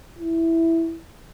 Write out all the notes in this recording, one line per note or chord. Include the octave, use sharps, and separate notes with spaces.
E4